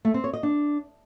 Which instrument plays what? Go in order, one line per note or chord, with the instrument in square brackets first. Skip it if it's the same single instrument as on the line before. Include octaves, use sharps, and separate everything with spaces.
[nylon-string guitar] A3
C4
C#5
D#5
D4